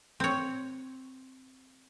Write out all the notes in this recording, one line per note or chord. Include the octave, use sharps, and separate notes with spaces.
C4 C#5